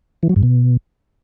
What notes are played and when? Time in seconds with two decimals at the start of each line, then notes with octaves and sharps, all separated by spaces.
0.23 E3
0.29 F#3
0.36 G2
0.43 B2